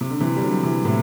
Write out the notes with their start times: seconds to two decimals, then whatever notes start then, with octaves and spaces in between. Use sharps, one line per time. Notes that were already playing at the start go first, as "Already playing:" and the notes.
0.01 C3
0.10 D3
0.20 C3 E3
0.37 G3
0.42 D3 F#3
0.63 C3 E3
0.85 A2 C3